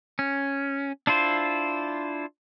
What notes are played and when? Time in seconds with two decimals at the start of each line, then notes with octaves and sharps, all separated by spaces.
0.19 C#4
1.07 D4 E4 F4 C5